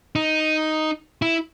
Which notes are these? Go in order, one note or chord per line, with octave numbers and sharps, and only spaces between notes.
D#4
E4